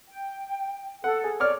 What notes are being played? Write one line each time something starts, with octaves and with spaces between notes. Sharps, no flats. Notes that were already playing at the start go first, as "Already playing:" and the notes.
G5
A4 F#5
G#4
C#5 D5 D6 F6